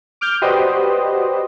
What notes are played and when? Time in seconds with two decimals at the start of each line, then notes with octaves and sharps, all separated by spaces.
0.21 D6 F6 G6
0.42 F#4 G4 B4 C5 D5 D#5